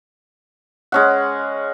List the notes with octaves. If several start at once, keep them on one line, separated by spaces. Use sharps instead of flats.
G#3 C#4 F#5